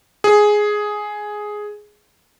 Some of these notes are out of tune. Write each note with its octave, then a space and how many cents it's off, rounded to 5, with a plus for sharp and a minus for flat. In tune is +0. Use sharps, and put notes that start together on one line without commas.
G#4 +5